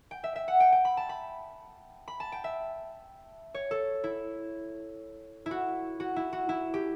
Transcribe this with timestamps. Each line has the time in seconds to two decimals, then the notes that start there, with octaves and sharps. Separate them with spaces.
0.11 G5
0.24 E5
0.36 E5
0.48 F#5
0.60 G5
0.72 G5
0.85 B5
0.97 A5
1.09 B5
2.08 B5
2.20 A5
2.32 G5
2.44 E5
3.54 C#5
3.71 A4
4.04 E4
5.46 E4
5.51 F#4
6.00 F#4
6.16 E4
6.33 F#4
6.49 E4
6.74 G4